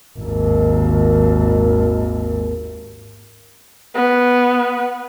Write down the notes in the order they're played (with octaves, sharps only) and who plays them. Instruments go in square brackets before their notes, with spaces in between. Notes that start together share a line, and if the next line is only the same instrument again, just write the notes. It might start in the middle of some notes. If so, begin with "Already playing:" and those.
[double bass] G#1 D#2
[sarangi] B3